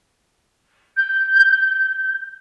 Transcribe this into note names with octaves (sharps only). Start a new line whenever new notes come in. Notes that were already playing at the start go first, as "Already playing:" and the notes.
G6